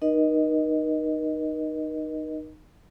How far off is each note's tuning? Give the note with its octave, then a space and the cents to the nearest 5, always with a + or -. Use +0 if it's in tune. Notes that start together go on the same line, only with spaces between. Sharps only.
D#4 -15 A#4 +40 D#5 +0